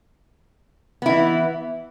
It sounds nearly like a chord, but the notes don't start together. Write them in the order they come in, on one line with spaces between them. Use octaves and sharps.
B3 E4 E3